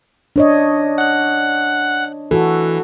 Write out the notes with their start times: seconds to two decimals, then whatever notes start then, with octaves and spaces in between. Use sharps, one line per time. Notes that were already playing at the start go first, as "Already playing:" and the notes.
0.36 D4 C#5 D#5
0.98 F#5 F#6
2.31 E3 F#4 A4